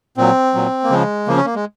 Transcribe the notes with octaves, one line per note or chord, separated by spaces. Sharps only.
A#2 F#3 C4
A#2 F#3
A#3
C#3 F3 G#3
C#3 F3 A#3
C#4
A#3
G#3